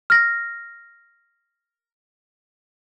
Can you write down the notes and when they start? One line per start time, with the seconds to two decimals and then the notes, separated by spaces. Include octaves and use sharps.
0.10 F6 A#6